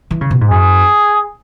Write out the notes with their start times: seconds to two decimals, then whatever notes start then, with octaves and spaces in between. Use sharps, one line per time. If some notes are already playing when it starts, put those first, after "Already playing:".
0.11 E3
0.21 C#3
0.31 B2
0.41 G#2
0.50 F#2 G#4